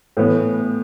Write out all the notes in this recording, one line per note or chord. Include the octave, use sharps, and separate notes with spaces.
A2 E3 B3